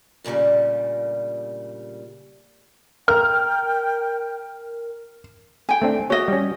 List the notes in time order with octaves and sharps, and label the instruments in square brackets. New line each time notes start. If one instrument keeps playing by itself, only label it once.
[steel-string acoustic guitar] G2 A#2 C#3 G3 A3
[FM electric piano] A#4 [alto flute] G5 [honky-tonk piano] F6
[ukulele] G5 G#5
[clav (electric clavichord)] A3 C4 D4
[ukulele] F#4 D#5 [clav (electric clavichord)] C#5 E5
[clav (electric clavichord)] G3 C#4